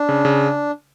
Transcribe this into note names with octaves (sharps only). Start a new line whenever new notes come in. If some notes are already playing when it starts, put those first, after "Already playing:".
Already playing: D4
C#3
C#3